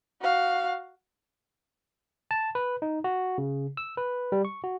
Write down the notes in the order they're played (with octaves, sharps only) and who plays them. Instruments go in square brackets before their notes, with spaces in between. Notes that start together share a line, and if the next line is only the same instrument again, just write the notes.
[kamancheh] F#4 F5
[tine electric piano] A5
B4
D#4
F#4
C#3
E6
B4
G3
C#6
F#4